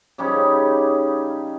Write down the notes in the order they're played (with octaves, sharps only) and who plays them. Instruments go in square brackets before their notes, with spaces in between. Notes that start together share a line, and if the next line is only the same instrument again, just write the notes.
[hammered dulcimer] C#3 G3 C#4 D#4